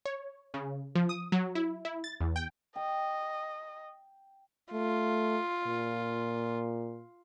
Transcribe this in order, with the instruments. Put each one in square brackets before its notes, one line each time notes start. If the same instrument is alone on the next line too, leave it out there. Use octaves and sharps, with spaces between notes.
[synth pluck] C#5
C#3
F3
D#6
F#3
E4
E4
A6
E2
G5
[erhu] D#5 [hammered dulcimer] G5
[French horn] A3 [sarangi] F4
[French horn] A#2